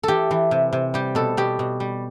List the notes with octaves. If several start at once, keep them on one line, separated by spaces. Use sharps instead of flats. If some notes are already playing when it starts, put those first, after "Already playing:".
E3 G4 A4
E3
C3
C3
G3 G4
B2 A4
B2 G4
B2
G3